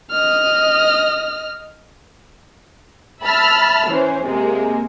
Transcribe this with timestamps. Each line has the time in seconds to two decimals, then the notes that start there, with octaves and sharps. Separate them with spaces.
0.12 D#5 F6
3.22 E5 A5 B5 E6 F6
3.89 E3 C#4 C5
4.25 C3 G#3 A#3